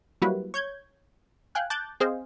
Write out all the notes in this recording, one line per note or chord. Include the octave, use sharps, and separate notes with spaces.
F#3 G3 A#3 E4 F#4 B4
C#5 G6 G#6
F5 G5 G#5 F#6
A5 D6 F#6 G6 A6
C4 G#4 C5 D#5 F5